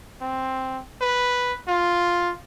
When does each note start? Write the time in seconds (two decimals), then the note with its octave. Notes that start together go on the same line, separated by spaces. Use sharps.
0.21 C4
1.01 B4
1.68 F4